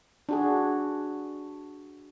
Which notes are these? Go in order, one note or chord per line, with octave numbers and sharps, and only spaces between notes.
D4 F#4 G#4